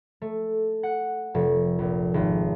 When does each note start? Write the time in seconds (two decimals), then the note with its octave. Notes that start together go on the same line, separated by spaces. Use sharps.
0.22 A3
0.83 F#5
1.34 F1
1.79 A#1
2.14 G#1